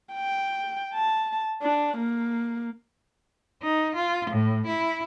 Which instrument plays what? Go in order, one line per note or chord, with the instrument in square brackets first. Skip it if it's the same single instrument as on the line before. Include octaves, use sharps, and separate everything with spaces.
[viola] G5
A5
D4
A#3
[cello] D#4
F4
A2
E4